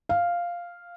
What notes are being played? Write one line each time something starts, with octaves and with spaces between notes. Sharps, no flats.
F5